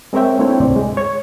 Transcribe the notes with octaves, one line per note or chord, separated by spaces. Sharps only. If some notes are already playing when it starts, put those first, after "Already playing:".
G#3 C4 A#4 C#5 E5 G5
A3 C4 D4 E4 C#5 G5
D2 G#2 C3 C4 D5
G#3
C#5 G#6